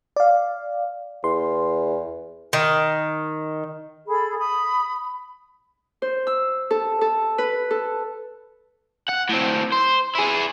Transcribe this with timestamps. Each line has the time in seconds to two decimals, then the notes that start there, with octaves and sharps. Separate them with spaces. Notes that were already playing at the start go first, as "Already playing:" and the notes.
0.16 D5 F5
1.24 E2 C6
2.53 D#3
4.07 G#4 A4 B5
4.37 B5 D#6
6.02 C5
6.27 E6
6.71 A4
7.01 A4
7.38 B4
7.71 A4
9.09 F#5
9.30 A2 C4
9.72 C5
10.15 E4 G#4